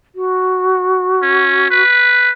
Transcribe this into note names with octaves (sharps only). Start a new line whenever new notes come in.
F#4
C#4
B4